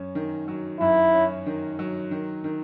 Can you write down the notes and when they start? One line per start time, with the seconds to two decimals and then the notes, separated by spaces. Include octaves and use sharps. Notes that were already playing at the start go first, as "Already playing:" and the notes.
Already playing: F#2 C#4
0.15 D#3
0.48 F#3
0.81 F#2 E4
1.14 C#4
1.46 D#3
1.79 F#3
2.11 D#3
2.44 D#3